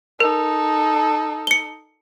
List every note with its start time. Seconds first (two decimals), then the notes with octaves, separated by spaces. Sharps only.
0.20 D#4 A4 A#4
1.47 C#7 G7